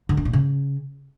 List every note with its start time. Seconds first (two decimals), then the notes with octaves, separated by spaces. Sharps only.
0.09 D3
0.17 D4
0.25 A#2
0.33 C#3